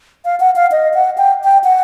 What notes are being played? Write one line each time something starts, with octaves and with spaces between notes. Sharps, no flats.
F5
F#5
F5
D#5
F#5
G5
G5
F#5